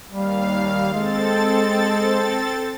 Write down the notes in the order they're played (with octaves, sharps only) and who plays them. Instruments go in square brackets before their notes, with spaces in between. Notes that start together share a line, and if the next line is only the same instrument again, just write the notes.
[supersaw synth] D#2 F5 [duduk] G3
[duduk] G#3 [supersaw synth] C4 A4 A6